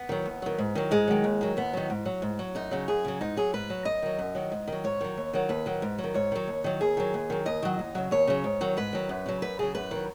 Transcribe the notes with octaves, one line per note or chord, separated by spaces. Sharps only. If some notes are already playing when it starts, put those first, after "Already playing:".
Already playing: B3
D#3 F#3
D#2
D#3 F#3
G#2
D#3 F#3
G#2 G#3
D#3 F#3
D#2
D#3 F#3
D#2 B3
D#3 F#3
G#2
F#3
G#2
F#3
F#2 D#4
C#3 F#3
F#2 G#4
C#3 F#3
G#2 D#4
F#3 G#4
G#2 B4
F#3
F#2 D#5
D#3 F#3
F#2
D#3 F#3
G#2
D#3 F#3
G#2 C#5
D#3 F#3
D#2
D#3 F#3
D#2 B4
D#3 F#3
G#2
F#3
D#3
G#2 C#5
D#3 F#3
D#2
D#3 F#3
D#2 G#4
D#3 F#3
D#2
D#3 F#3
D#2 D#5
D#3 F#3
D#2
C#3 F#3
D#2 C#5
C#3 F#3
G#2
D#3 F#3
G#2 B4
D#3 F#3
F#2
C#3 F#3
F#2 B4
C#3 F#3 G#4
F#2 B4
D#3 F#3